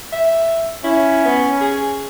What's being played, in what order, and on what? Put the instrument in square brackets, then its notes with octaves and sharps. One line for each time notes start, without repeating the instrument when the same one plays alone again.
[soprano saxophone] E5
[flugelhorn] C#4 [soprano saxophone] E4
[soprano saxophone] B3
G#4